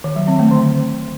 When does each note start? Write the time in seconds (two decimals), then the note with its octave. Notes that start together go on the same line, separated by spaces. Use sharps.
0.04 D#3
0.16 F#3
0.28 C4
0.39 A3
0.51 D3